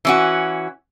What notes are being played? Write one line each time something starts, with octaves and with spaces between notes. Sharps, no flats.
E3 C#4 F#4